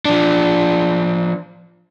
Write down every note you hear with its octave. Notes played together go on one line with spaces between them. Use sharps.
F3 D4